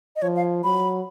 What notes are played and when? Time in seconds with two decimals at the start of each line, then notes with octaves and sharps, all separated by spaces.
0.16 D#5
0.22 F3 C#5
0.36 F5
0.64 F#3 B5